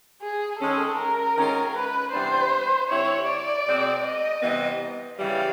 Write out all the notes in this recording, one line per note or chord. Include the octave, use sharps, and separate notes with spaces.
G#4
D#3 G#3 C#4 A4
A#4
G#2 D#3 G#3 C#4 F4
B4
C3 E3 G3 B3 D4 C5
D3 G3 C4 E4 C#5
D5
B2 G#3 C4
D#5
C3 E3 G3 B3
C#3 E3 G3 F5